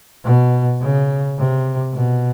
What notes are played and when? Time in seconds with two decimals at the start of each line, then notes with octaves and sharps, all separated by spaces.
0.25 B2
0.81 C#3
1.37 C3
1.93 B2